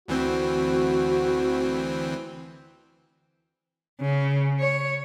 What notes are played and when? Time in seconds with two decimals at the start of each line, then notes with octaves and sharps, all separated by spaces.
0.08 D2 E3 C4 F#4
4.01 C#3
4.60 C#5